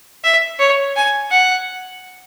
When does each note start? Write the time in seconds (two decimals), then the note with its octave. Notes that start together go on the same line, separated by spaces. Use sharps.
0.24 E5
0.59 C#5
0.96 G#5
1.31 F#5